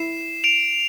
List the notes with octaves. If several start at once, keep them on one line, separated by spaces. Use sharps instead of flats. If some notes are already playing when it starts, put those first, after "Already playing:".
Already playing: E4 C7 E7
D7 F7